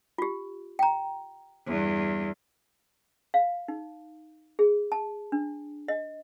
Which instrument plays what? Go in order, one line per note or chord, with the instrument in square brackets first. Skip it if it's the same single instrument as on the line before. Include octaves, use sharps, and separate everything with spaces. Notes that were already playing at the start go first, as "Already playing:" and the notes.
[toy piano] F4 G4
G5 A#5
[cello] E2 G2
[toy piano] F5
D#4
G#4
A5
D4
D#5